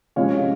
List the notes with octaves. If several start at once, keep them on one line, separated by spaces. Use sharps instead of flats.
C3 F3 G#3 C#4 C#5 F5